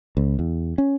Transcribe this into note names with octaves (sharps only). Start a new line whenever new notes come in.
C#2
E2
C#4